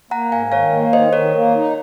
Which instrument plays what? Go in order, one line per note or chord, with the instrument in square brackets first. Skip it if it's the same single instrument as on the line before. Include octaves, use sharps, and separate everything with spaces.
[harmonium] A#3 [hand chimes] F#5 A#5
[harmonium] G#2 [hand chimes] F5 G#5
[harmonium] D#3 [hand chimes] C#5 F5
[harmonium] A#3
[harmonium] D#3 [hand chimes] C5 D#5
[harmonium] D#3 [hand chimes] A#4 C#5
[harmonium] A#3
D#4